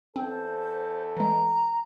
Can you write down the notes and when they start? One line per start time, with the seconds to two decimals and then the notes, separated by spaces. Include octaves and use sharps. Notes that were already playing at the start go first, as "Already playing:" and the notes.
0.16 E2 C4 A4 C5
1.17 E3 G#3 A#5